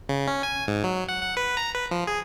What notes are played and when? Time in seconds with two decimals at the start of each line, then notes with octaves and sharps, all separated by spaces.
0.09 C#3
0.27 C#4
0.43 G#5
0.68 G#2
0.84 F#3
1.09 F#5
1.23 F#5
1.37 B4
1.57 A#5
1.75 B4
1.91 F3
2.07 G#4